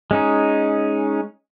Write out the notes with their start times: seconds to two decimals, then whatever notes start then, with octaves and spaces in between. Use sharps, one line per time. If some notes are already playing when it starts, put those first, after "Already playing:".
0.11 G#3 C#4 D#4